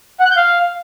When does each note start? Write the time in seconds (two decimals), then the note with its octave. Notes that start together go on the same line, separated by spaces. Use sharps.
0.20 F#5
0.25 F#6
0.31 G6
0.37 F5